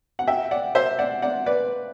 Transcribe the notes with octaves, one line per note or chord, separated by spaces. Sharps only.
F#5
E5 G5
D5 F#5
C5 E5
D5 F#5
D5 F#5
B4 D5